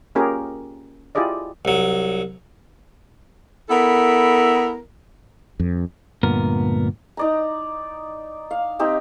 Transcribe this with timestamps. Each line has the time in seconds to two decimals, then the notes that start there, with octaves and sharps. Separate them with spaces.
0.15 A#3 C#4 F4 G4 G#4 A#4
1.15 E4 F4 G4 G#4 D5 D#5
1.65 C2 F#3
3.69 B3 E4 A4 A#4
5.60 F2
6.23 D2 G2 A#2 B3 A#4
7.17 D#4 D5 A#5
8.51 F5
8.79 C4 D#4 G4 E5